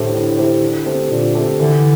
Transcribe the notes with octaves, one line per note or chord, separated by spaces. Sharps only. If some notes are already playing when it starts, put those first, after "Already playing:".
Already playing: A2 D3 A3 E4 G4 C5
D3
A3 E4 G4 C5
D3
A3 C4 G4
A#2 D3
A3 C4 G4
D3 E3